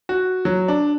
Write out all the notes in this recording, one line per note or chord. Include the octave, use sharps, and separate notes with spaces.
F#4
F#3
D4